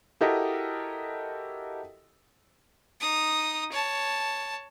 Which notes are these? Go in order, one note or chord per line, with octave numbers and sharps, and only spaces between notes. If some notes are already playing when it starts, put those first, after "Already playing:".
E4 F#4 G4 A4 A#4 D#5
D#4 D#6
C#5 A5